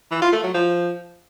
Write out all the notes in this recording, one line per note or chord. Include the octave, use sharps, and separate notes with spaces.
E3
F4
A3
F#3
F3